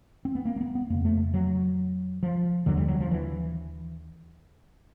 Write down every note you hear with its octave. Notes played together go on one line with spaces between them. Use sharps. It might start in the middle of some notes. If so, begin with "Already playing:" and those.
C4
B3
A#3
A#3
B3
B3
F2 C#3 A#3
A3
F#3
F3
D#2 D3 F#3
G3
F#3
F3
E3